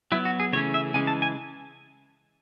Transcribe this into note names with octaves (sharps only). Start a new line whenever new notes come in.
F#3 B3 E4
F#4
G#4
C#3 E3 A3 C#4 C#5
E5
C#3 E3 G#3 C#4 G#5
A5
G#5